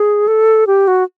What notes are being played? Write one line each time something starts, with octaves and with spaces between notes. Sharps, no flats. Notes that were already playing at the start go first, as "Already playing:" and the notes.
Already playing: G#4
A4
G4
F#4